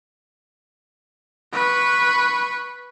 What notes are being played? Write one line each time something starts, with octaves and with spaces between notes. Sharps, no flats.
B4 C#6